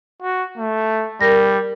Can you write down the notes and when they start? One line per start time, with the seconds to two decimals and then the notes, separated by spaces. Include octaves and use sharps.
0.22 F#4
0.58 A3
1.21 G3 A#4 A#6